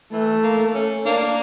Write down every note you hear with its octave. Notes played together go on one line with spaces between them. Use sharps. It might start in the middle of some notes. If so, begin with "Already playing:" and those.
E3 A3
A#3
C#4
A#3 D4